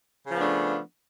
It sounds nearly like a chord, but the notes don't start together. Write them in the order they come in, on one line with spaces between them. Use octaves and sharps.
C#3 F3 B3 D4 A3